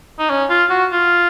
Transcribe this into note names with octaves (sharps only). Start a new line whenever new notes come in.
D#4
C#4
F4
F#4
F4